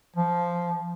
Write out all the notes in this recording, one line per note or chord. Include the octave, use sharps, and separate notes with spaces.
F3